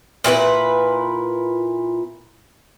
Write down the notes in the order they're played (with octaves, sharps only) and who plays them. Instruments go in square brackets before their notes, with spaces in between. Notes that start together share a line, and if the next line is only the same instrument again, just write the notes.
[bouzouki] A#2 E4 F#4 B4